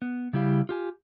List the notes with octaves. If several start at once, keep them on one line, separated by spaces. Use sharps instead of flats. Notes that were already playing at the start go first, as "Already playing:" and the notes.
B3
C#3 G3 E4 G4 F5
F4 G4 G#5